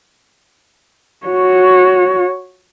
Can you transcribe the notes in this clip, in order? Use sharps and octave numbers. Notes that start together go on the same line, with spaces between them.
F#4 C#5